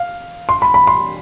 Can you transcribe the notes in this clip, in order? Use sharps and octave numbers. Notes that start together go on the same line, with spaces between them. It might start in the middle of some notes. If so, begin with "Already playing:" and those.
Already playing: F5
C6
B5
B5
C6